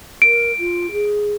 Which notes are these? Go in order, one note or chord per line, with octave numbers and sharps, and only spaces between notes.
A#4 D7
F4
G#4